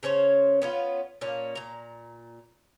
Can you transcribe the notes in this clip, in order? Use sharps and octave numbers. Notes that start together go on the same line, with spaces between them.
C#3 C#4 C5 C#5
B3 C#4 F4
A#2 A#3 C#4
A#2 A#5